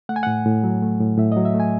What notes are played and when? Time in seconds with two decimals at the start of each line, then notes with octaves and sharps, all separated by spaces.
0.09 A3 F#5
0.16 G#5
0.23 A2 F#5
0.45 A2
0.64 F#3
0.82 A3
1.01 A2
1.18 A2 E5
1.32 F#3 D#5
1.45 E5
1.54 A3
1.60 G#5